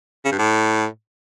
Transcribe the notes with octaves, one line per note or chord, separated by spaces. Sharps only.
C#3
G2
A2